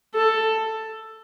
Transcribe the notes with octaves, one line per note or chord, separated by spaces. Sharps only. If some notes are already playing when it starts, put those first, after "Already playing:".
A4